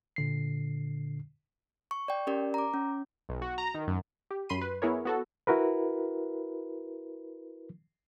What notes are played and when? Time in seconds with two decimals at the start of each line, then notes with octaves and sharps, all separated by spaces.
0.16 A#2 D3 C7
1.91 C#6
2.08 D5 G5
2.27 C#4 G4 A#4 D5
2.54 A#5 D6
2.74 C#4
3.29 B1
3.42 F#4
3.58 A#5
3.75 D#3
3.87 F#2
4.31 G4
4.49 F#2 B5 C6 C7 D#7
4.61 B4
4.82 B3 E4 G#4 A#4 C#5
5.05 B3 F#4 A4
5.47 E4 F#4 A#4 B4